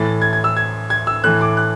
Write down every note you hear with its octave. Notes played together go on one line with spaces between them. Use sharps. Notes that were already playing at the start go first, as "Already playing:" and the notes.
Already playing: A2 E3 A6
G#6
G#6
E6
G#6
G#6
E6
A2 E3 F#6
D6
F#6